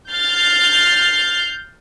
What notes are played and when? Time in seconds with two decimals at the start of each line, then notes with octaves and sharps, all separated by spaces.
0.11 F6 G6 A6 C7